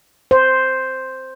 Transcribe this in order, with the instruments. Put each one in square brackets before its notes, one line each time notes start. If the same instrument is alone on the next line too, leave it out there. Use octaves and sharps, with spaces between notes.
[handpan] C5